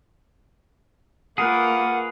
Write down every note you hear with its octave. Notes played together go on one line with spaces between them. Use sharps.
A#3 F4 G#4 A#4 B4 F#5